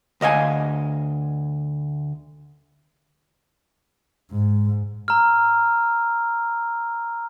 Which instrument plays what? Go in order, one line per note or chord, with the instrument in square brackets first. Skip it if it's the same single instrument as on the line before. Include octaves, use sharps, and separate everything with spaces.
[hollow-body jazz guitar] D2 D#5 F5 G#5
[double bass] G#2
[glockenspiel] A#5 E6 F6